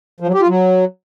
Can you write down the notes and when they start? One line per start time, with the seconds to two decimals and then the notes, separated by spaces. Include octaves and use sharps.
0.20 F3
0.27 F#3
0.34 G4
0.41 F4
0.48 F#3